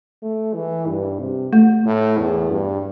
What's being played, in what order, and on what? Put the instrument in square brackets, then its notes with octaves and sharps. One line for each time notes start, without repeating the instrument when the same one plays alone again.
[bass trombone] A3
E3
G2
C3
[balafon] A3
[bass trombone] A2
E2
G2